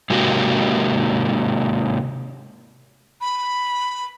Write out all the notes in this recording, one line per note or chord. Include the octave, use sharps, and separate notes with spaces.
C3 G#3 A#3 F#4 G4
B5